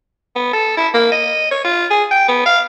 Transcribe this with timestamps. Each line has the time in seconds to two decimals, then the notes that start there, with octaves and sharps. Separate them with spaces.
0.36 B3
0.53 A4
0.77 E4
0.94 A#3
1.12 D#5
1.51 C#5
1.65 F4
1.91 G#4
2.11 G5
2.28 B3
2.46 F5